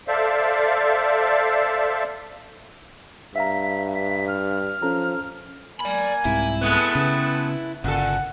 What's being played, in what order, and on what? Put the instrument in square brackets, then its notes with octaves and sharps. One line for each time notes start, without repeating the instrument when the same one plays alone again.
[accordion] A4 C5 D5 E5 F5
[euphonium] G2 [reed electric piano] E5 F5 A#5 [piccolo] B6
[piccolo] B6
F6
[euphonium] F3 [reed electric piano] C#4 A4 A#5
[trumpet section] A#3 G#5 [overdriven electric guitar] D5 B5
[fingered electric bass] C2 G#2 C3 [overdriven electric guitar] E4
[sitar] G#3 A3 B3 [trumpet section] B4 G5 A5
[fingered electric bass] C#3
[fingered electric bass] G1 C#3 [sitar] A#2 A4 [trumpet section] F#5